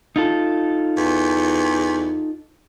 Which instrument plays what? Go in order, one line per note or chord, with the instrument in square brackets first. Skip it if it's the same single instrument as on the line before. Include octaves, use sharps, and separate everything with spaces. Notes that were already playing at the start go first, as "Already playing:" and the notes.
[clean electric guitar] D#4 F4 A4
[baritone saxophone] E2